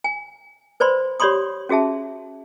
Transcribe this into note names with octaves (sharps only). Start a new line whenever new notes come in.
G#5
B4 C5 D5 B5 C6
G4 C#5 D5 B5 C6 D#6
C#4 F#4 G#4 E5 A5